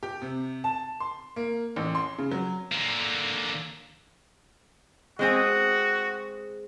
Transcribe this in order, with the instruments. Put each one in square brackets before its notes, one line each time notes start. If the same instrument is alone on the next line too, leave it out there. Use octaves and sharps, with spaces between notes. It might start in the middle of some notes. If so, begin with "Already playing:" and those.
[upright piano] G4
C3
A5
C6
A#3
A1
C6
C#3
F#3
[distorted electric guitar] D3 A#3
[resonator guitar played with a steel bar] G#3 C4 G#4 [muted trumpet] F#4